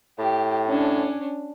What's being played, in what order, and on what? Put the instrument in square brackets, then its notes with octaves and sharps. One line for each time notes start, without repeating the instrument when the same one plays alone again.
[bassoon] A2 [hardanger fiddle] G4
[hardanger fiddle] C#4 D4